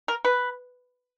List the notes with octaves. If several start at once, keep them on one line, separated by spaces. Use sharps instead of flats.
A#4
B4